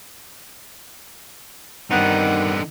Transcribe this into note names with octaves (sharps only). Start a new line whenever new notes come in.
G2 D3 D#3 B3 C4 D#4 F#5